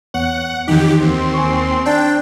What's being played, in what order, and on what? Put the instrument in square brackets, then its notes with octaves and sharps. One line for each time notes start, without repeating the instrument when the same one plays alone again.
[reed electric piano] E2 B3 C#5 [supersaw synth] F#5
[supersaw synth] F2 G4 [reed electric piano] D#3 E3 D#4
[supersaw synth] D#2 [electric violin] C4 C6
[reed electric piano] G#5 C#6
[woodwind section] D4 [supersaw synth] G5